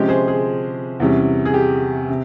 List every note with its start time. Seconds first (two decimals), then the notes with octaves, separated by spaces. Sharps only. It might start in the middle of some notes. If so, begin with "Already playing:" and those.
Already playing: C3 F3 G#3 C#4 G4
0.09 G#4 C5
0.28 G#4
1.00 E2 C3 G3 C#4
1.45 G#4
1.54 G4
2.09 C3